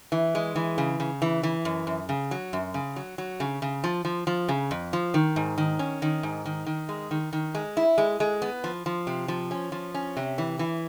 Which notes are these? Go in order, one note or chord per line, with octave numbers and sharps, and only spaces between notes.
E3
G#3
E3
C#3
C#3
E3
E3
F#2
F#2
C#3
F#3
F#2
C#3
F#3
F#3
C#3
C#3
F3
F3
F3
C#3
F2
F3
D#3
G#2
D#3
C#4
D#3
G#2
D#3
D#3
G#3
D#3
D#3
G#3
E4
G#3
G#3
B3
F3
F3
C3
F3
C#4
F3
C#4
C3
E3
E3